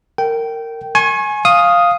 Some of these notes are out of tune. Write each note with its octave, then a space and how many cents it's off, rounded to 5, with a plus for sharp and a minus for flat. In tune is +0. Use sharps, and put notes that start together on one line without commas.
A#4 -20 G5 -15
G#5 +15 C#6 -35
F5 +0 D#6 +0